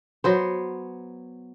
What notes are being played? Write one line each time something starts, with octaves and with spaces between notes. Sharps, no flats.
F#3 B3 C5